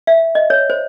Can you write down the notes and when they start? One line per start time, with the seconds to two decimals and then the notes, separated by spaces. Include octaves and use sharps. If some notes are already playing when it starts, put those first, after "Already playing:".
0.07 E5
0.35 D#5
0.50 C#5
0.70 C5